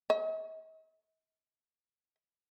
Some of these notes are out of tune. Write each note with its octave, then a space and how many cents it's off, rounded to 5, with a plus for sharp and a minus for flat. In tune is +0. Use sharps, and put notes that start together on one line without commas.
D#5 +45